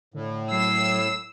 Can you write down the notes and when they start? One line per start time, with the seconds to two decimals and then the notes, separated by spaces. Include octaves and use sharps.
0.14 A2 D3
0.51 F#3 E6 C7